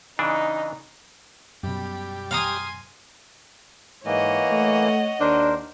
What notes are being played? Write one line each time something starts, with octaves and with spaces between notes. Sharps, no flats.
C#3 E3 D4 D#4
F#2 B2 G3 G4 B5
F5 G#5 A#5 C6 D#6
G#2 E3 A#3 C#5 D#5 F#5
A3
D#2 D4 A#4 C5